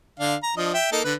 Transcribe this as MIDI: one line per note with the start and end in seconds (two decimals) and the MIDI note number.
0.19 0.35 50
0.19 0.35 62
0.19 0.35 77
0.43 0.53 82
0.57 0.73 53
0.57 0.73 62
0.57 0.73 75
0.74 0.87 76
0.74 0.87 79
0.92 1.00 58
0.92 1.00 63
0.92 1.00 69
1.05 1.14 50
1.05 1.14 71